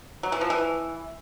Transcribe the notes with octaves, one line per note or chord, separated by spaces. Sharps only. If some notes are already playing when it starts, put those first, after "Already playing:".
F#3
E3
F3
E3